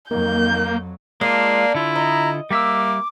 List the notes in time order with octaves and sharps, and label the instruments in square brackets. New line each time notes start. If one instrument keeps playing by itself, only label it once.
[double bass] F2 F#3 [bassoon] D#3 [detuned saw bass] A#3 [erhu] G6
[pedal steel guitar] G#3 F4 [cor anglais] A#3 [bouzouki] D4 [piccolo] C7
[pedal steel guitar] D3 F4 [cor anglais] E4
[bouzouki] D#5 [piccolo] A#5
[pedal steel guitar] G3 E5 E6 [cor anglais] A#3 [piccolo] D6